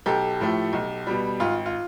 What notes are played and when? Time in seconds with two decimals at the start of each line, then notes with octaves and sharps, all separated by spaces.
0.06 B1 G4 A4
0.40 A2 F3 A3
0.73 B1
1.07 B2 G3
1.40 G#1 F4
1.66 F4